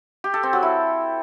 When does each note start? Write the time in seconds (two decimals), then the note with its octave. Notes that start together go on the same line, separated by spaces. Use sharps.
0.24 G4
0.34 A4
0.43 C4
0.53 F#3
0.63 E4